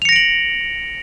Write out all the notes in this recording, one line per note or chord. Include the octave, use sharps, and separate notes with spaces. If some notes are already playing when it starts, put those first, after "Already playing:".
A#6 C#7 D7 F7 F#7